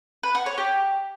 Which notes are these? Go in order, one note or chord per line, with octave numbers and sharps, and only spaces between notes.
B4
F#4
C#5
G4